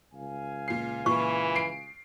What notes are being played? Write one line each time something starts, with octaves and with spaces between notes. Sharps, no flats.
C#2 F5 G#5
A#2 C7
A#2 E3 C#6
C7 D7